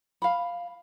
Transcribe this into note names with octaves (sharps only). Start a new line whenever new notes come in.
F5 B5